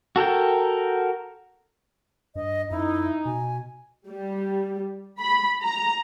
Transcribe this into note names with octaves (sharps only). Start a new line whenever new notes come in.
F#4 A4 A#4 G5
G2 D#5
F#2 D#4 E4
B2 G#5
G3
B5
A#5